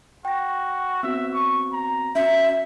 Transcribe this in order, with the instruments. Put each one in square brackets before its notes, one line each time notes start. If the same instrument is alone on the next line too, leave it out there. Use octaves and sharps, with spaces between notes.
[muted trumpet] F#4 [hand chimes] G5 A#6
[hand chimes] B3 C4 F#4 [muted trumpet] E5
[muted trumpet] C#6
A#5
[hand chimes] C#4 F#4 C#7 [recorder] E5